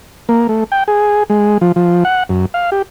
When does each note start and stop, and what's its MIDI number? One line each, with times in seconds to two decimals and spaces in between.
0.29 0.47 58
0.49 0.64 57
0.72 0.84 79
0.88 1.23 68
1.30 1.58 56
1.61 1.72 53
1.76 2.04 53
2.05 2.23 78
2.29 2.46 42
2.54 2.70 77
2.72 2.82 67